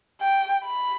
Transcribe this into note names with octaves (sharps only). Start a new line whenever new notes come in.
G5
B5